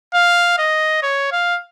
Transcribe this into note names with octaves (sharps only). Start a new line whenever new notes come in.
F5
D#5
C#5
F5